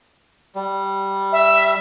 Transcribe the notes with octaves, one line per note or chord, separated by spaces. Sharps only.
G3
E5